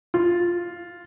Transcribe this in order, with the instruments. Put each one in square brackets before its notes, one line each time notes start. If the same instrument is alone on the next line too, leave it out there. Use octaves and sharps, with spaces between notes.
[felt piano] F4